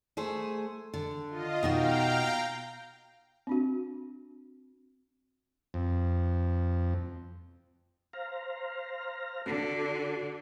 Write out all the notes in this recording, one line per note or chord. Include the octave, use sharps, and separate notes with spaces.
A3 G#4 C5
D3
F4 D#5
B2 D#4 F#4 F5 G5 A#5
C4 D4 F#4
F2
C5 F5 A#5
D3 F#4 A4